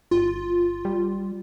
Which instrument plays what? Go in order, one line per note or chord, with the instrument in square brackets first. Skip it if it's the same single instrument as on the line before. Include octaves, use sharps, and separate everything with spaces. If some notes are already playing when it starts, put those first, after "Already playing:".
[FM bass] G1 [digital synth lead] F4
[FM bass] G3